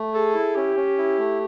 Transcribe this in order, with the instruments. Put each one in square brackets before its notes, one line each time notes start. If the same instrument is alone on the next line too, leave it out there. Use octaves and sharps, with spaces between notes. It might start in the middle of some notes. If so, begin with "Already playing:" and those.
Already playing: [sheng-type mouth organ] A3
[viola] G#4 [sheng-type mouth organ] A4
[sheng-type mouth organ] E4
[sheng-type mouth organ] C#4 [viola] G4
[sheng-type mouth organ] C#4
E4
A3